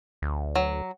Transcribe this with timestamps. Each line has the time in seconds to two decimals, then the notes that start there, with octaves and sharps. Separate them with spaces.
0.22 D2
0.55 F#3